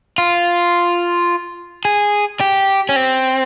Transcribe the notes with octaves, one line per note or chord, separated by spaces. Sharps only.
F4
G#4
G4
C#4
C4